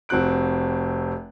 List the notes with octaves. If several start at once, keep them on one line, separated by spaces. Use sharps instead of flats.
F1 C4 F#4 F#6 D7